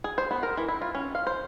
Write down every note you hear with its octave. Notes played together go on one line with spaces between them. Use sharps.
G#4
C5
B3
A#4
E3
E4
F4
C#4
F5
C5